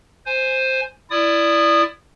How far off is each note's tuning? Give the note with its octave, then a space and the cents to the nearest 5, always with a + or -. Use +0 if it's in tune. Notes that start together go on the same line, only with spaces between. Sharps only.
C5 +0 G#5 +0
E4 +15 D5 +0 D#6 -20